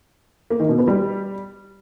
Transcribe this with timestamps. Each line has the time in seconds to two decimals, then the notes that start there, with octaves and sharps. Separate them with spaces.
0.50 A#3
0.60 D#3
0.69 B2
0.78 B3
0.88 G3